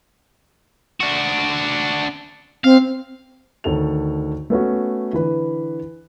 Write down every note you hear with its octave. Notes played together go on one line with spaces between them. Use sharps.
D4 F#4
C4 F5
D2 D#3 A4 C#5 F7
A3 B3 C#4 F#4
D3 E3 B4